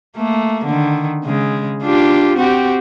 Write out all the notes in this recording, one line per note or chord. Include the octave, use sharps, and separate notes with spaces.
A3 A#3
D3 D#3
C#3 G#3
D4 F4 G4
C4 F#4 G4